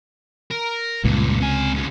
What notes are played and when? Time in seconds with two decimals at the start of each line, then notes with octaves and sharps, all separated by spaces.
0.51 A#4
1.04 C#2 G2 A#2
1.41 C3 G#5
1.74 D#2 C#3